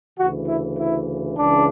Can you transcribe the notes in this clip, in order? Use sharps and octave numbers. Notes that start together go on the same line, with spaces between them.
D2 C#3 E3 F#4
E4
E4
C#2 C#3 E3 D4